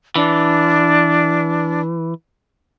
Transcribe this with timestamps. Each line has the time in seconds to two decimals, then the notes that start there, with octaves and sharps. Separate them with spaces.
0.16 E3 D4